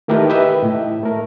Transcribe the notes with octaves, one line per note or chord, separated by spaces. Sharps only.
D#3 A3 E4 G4 A#4 B4
G4 B4 D#5 E5
A2 E4
A3 A#4